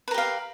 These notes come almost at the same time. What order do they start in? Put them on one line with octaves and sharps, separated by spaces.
B4 A#4 G4 F5